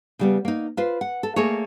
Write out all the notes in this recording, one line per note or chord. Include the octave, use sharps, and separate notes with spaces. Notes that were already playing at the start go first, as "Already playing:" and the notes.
C#3 G3 B3
A#3 D#4
F4 B4 C5
F#5
A4
A3 A#3 G#4 A#4 C#5